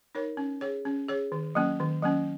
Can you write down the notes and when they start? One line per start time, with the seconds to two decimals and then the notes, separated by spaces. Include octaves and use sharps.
0.15 D#4 A#4 C#5
0.37 C#4
0.61 G#4 C#5
0.85 C#4
1.09 G#4 C#5
1.32 D#3
1.55 F#3 A#3 C#4
1.80 D#3
2.03 F#3 A#3 C#4